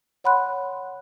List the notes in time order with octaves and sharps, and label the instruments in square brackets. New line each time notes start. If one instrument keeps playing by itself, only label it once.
[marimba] C#5 F#5 B5 C6 F#6